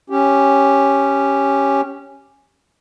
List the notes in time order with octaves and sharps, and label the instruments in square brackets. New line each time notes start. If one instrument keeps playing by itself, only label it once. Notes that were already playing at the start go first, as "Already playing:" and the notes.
[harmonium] C#4 G4